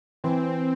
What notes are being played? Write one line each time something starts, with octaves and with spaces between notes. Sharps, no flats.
E3 C4